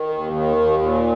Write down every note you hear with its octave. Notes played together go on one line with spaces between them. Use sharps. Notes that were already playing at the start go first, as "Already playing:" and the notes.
Already playing: D#3
D#2
D#3
D#2
A#2